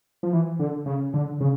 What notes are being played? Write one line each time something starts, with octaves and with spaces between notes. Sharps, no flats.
F3
E3
D3
C#3
D3
C#3